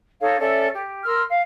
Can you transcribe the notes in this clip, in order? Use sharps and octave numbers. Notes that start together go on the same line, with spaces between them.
D#4 A4 C#5 F5
C#4 A4 D5 E5
G4
A#4 C6 E6 F6
F5